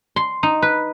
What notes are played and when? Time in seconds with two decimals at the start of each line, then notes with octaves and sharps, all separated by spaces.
0.16 C6
0.43 D#4
0.62 B4